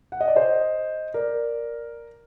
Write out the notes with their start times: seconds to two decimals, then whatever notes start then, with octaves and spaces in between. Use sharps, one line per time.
0.12 F#5
0.21 D#5
0.28 D5
0.36 C5 D#5
1.14 A#4 D5